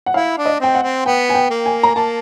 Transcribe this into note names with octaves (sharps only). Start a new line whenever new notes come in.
F#5
E4 F5
D4
D#5
C4 G5
F#5
C4
B3 G5
G#5
G5
A#3
G#5
A#5
A#3 A5